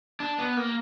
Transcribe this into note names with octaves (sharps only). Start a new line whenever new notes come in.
D4
B3
A#3